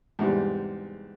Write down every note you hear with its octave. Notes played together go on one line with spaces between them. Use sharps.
E2 G#2 C3 G3